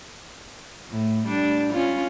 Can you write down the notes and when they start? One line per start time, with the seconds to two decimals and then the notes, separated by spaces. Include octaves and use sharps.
0.90 A2
1.27 G3 D4
1.73 C#4 F4